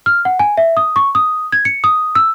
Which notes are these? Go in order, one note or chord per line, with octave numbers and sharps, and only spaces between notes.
F6
F#5
G#5
E5
D#6
C#6
D#6
G#6
C#7
D#6
E6